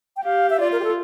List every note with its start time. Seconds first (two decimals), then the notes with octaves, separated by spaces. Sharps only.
0.17 G5
0.24 G4 F5
0.50 E5
0.60 F4 D5
0.72 A#4
0.80 G4
0.84 A4